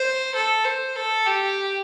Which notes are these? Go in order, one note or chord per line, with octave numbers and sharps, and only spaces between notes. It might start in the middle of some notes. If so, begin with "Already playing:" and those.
Already playing: C5
A4
C5
A4
G4